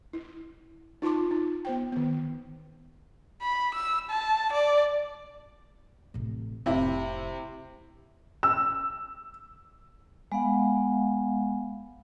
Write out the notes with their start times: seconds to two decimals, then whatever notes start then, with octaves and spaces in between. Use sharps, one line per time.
0.13 E4
1.02 D#4 F4 A5 C6 D6
1.31 D#4
1.65 B3 C5 G5
1.92 D#3 B3
3.42 B5
3.75 E6
4.10 A5
4.53 D5
6.14 A1 C3
6.66 F1 A2 C3 E4
8.43 E6
10.32 G#3 B3 F5 F#5